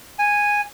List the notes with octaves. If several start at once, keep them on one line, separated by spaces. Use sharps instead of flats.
G#5